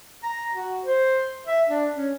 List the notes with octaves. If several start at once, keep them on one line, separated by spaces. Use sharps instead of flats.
A#5
F#4
C5
E5
D4
C#4